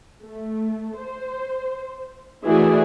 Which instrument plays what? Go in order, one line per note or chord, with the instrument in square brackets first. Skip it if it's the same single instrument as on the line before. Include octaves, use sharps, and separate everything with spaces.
[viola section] A3
C5
E3 A3 E4 F#4 G#4 D5